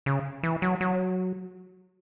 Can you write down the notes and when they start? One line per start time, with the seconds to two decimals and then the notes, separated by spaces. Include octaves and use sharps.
0.06 C#3
0.43 E3
0.62 F#3
0.81 F#3